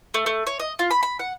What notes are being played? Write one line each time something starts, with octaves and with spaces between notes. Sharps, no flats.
A3
A3
C#5
D#5
F4
B5
B5
F#5